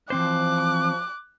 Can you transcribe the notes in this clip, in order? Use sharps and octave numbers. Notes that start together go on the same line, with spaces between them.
E3 F3 C4 C5 D6 F#6